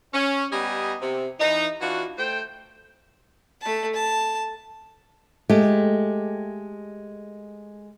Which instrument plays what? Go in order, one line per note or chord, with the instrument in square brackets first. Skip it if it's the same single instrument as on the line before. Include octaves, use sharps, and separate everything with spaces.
[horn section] C#4
G3 B3 G4 D#5 G#5 A#5
C3
E3 D#4
E3 D4 F4 F#4
A3 C5 G5
[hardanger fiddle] A3 A5
A5
[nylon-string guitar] G#3 A3 G4